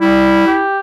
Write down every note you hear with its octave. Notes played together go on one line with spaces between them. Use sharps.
G3 E4
G4